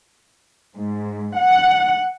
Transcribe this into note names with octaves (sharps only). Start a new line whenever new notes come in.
G#2
F#5